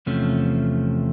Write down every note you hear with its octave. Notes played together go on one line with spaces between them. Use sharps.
E2 C3 F3 A3 C#4